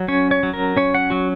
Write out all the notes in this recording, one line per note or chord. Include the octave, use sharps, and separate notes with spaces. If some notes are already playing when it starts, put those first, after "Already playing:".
Already playing: F#3
C#4 C#5
C#5
F#3
A#4
C#4 C#5
F#5
F#3 F#4